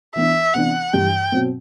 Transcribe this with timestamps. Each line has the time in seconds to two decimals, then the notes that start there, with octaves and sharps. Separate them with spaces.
0.16 E3 B3 D4 E5
0.54 C3 E3 B3 D4 F#5
0.93 G2 E3 G3 G5
1.32 B2 F#3 C4